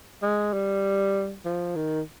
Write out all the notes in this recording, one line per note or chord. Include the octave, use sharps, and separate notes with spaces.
G#3
G3
F3
D#3